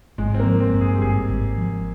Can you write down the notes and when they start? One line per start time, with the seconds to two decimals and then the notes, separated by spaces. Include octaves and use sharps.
0.18 G#1 G#3
0.34 C4
0.40 A#3
0.46 F3
0.60 C4
0.74 G2
0.81 G#4
0.95 G4
1.02 G#1 G#4
1.30 G#1
1.58 F3